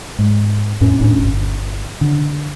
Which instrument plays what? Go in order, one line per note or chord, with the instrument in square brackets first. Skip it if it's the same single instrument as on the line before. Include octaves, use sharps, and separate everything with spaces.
[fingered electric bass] G#2
F2 A2 C#4
D#1 A2 C#4 D4
G1
D3